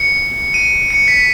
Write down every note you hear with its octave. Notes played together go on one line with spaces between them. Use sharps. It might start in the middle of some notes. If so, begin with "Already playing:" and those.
Already playing: C#7
D#7
C#7
B6